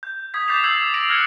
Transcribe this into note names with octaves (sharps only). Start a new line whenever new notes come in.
G6
D#6 G#6 B6
D6 G6 A6 B6 C7 F7
E6 G#6 A6 C7 F#7
A#6 D7 F7
F6 F#6 G#6 C#7 G7